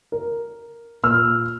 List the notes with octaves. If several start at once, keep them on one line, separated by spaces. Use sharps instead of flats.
A#4
A#2 E6 F6